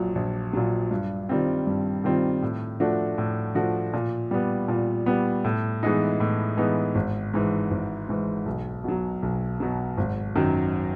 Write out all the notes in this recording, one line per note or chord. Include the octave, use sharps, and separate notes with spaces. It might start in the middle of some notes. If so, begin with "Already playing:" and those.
Already playing: A#1 A#2 F#3
A#1
A#2 F#3
G2
D#3 G3 C4 F4
G2
D#3 G3 C4 F4
A2
F3 A3 D4 F#4
A2
F3 A3 D4 F#4
A#2
G3 B3
A#2
G3 B3
A2
E3 G#3 B3 D#4
A2
E3 G#3 B3 D#4
G#1
G#2 E3
G#1
G#2 E3
B1
B2 F#3
B1
B2 F#3
G#1
F#2 D#3 F#3